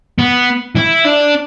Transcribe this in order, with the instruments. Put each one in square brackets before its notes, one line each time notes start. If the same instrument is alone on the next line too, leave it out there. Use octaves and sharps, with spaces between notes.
[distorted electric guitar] B3
E4
D4